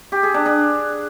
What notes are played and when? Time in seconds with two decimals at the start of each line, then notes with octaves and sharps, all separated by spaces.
0.12 G4
0.23 G#4
0.34 D4
0.45 D4